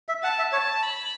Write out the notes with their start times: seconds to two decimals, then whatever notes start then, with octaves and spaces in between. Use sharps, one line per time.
0.09 E5
0.23 F#5 A5
0.38 E5
0.52 C#5 A5
0.83 B5